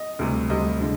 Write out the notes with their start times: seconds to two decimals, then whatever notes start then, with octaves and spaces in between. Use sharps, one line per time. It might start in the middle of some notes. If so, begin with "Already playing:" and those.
Already playing: D#5
0.19 D2 C3 G3
0.50 D2 C3 G3 D#5
0.81 D3 G#3